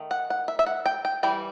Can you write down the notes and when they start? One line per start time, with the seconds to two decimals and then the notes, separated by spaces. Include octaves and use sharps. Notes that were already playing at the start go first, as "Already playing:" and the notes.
Already playing: D#3 A3
0.11 F#5
0.30 F#5
0.48 E5
0.59 E5
0.66 F#5
0.86 G5
1.05 G5
1.23 E3 G3 G5